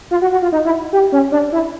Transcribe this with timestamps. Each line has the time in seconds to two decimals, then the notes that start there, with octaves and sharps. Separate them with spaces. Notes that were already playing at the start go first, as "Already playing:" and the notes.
0.11 F4
0.22 F#4
0.32 F#4
0.42 F4
0.52 D#4
0.65 E4
0.93 G4
1.12 C#4
1.32 D4
1.52 E4